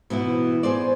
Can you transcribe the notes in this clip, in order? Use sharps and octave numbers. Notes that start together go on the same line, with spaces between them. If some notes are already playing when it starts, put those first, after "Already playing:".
B2 E3 B3 E4
G#4 C5 D5